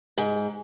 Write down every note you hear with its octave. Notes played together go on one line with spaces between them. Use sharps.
G#2